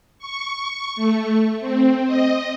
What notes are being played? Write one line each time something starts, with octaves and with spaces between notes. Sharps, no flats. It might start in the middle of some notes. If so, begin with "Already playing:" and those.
C#6
A3
C4
D#5